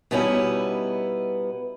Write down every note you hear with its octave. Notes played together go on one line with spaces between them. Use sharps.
B2 G3 B3 C#4 D#4 E4